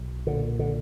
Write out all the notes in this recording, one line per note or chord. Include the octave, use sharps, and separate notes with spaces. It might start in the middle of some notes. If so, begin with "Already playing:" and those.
Already playing: B1
A#2 D3
D3